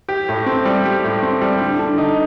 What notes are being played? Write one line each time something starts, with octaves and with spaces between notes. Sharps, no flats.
G4
A2
C4
G3
G4
A2
C4
G3
D3
D3
D#4